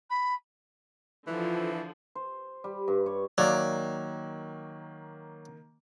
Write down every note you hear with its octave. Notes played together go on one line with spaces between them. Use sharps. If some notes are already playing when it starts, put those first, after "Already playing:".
B5
D3 E3 F3
C5
G3
G2
C#5
D#3 F#3 A#3 D5 F5